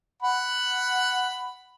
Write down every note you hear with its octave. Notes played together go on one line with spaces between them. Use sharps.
F#5 B5